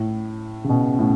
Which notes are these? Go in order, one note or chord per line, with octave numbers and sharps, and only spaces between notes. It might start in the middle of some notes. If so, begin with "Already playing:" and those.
Already playing: A2
C#3
B2
A2